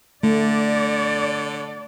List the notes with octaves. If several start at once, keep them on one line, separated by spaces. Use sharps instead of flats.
D3 A3 D5